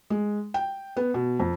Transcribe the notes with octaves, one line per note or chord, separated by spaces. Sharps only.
G#3
G5
B3
B2
F2